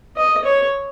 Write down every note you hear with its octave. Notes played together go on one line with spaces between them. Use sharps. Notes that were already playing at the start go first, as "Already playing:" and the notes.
D#5
C#5